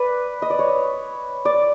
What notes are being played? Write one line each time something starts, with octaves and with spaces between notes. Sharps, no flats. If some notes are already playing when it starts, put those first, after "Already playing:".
Already playing: B4 D5
D#5
D5
C#5
D5